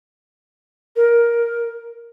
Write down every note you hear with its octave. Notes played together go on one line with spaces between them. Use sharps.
A#4